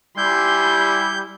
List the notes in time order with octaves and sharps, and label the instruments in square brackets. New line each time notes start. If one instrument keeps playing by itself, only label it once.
[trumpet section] G3 [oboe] E4 [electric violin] G#5 C6 [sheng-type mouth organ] G6